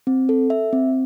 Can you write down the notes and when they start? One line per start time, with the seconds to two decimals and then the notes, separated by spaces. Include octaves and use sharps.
0.07 C4
0.29 A4
0.50 E5
0.73 C4